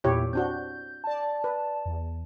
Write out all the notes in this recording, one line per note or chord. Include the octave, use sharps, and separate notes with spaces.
E2 A#2 E4 G4 C#5
C4 D4 F#4 G6
D5 A5
B4
E2